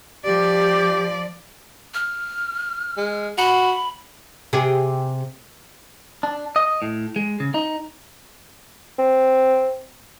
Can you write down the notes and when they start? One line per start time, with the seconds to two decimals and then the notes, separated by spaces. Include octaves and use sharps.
0.25 F3 G4 D5
1.94 F6
2.97 G#3
3.38 F#4 B5
4.53 C3 G4 G#4
6.23 D4
6.56 D#5
6.82 A2
7.16 G#3
7.40 C#3
7.54 D#4
8.99 C4